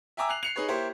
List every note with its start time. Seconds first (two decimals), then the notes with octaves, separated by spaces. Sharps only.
0.17 E5 G5 G#5 A#5 D6 E6
0.29 F#6 C7 F7 F#7
0.43 C7 C#7 F7
0.56 D#4 G#4 B4 C#5
0.68 A#3 E4 G4 C5 C#5